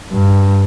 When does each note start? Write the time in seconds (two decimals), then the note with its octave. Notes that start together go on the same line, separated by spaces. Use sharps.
0.12 G2